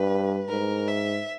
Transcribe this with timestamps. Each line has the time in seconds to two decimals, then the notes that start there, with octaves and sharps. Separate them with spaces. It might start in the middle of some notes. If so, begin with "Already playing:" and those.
Already playing: G2 B4
0.49 G#2 A#4
0.88 E5